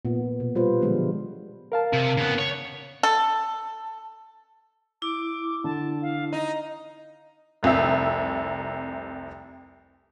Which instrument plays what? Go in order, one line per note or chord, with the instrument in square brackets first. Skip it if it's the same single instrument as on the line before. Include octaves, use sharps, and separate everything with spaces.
[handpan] A#2 B3
B2
G3 F4 B4 C5
D3 F3 F#3 G#3 B3 D4
[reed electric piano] A#4 F5 A5
[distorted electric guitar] C3
C#3 B3
C#5
[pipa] A4
[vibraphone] E4 [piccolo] D6
[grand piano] D3 [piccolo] A5
[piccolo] F5
[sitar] D#4 [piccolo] A#5
[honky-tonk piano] F1 C2 C3 E5